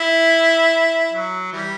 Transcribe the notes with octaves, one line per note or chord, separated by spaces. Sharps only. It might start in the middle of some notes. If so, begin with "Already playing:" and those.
Already playing: E4
F#3
E3 G3